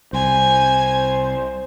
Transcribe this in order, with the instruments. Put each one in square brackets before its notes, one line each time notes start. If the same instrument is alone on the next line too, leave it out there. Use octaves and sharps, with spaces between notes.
[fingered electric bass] C2 [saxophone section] C5 [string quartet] G#5